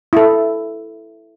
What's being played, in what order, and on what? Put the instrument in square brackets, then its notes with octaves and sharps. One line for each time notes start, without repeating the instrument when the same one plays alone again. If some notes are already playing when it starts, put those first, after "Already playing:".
[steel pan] E4 A4